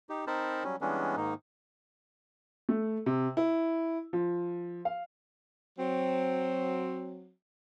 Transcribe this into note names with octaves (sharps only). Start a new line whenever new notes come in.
D#4 G4
C4 D#4 A#4 C5 A5 B5
F#3 G3 C#4
E3 G3 G#3 B3 C#4 D4
G#2 D#3 A#3 D#4
A3
C3
E4
F3
F5
F#3 C4